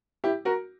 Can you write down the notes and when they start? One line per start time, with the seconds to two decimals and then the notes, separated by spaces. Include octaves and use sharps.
0.24 E4 G4
0.45 F#4 A#4